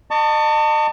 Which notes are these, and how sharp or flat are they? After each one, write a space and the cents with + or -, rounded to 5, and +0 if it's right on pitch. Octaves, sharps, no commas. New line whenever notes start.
D#5 -30 A5 +30 C#6 +30